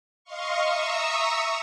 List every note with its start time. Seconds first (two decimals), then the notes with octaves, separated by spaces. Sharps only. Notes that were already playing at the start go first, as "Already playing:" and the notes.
0.24 D#5 F5 C6 C#6
0.60 E5 A#5 C#6 D#6 E6